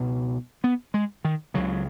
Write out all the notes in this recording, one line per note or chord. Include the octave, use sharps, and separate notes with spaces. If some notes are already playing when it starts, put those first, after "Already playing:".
Already playing: C#2 B2
B3
G#3
D#3
C#2 C#3 F#3